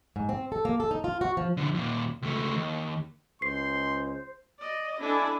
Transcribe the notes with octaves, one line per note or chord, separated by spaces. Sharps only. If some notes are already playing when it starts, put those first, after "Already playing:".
G#2
C4
A4
A#3
A4
D#4
F4
F#4
F3
D3 F3
D#2 A#2
C#2 A3
D#2
C#2 C5 C6 C7
D5 D#5
D4 E4 A4 G#5